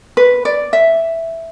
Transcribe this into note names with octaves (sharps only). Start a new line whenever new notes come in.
B4
D5
E5